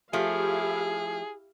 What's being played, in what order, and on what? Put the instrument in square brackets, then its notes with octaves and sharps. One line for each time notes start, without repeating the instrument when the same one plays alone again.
[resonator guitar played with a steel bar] F3 A3 [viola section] E4 G4 F5 [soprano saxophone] G#4